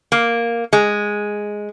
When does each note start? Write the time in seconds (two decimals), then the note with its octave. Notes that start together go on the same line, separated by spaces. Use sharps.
0.12 A#3
0.73 G#3